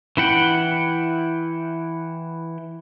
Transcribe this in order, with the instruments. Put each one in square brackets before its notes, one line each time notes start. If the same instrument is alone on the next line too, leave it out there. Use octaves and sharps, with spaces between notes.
[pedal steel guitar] E3 E4 F#5 G5